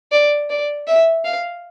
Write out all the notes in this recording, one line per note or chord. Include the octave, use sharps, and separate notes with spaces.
D5
D5
E5
F5